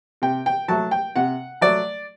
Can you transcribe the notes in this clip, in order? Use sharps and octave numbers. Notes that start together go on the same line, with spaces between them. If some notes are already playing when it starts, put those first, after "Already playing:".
C3 G5
G5
F#3 A3 A5
G5
C3 F#5
F#3 A3 D5